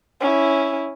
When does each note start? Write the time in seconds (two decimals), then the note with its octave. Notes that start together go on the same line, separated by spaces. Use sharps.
0.21 C#4 E4